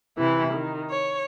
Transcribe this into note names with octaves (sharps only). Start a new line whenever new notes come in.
C3 E3 E4
D#3
C#5